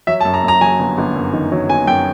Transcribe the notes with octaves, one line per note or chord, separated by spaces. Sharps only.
F#3 E5
A5
F#2
A#5
F#2 A#5
F#3 G#5
G1
G1
F#2
D#3
F#3
G1 G#5
F#2 G5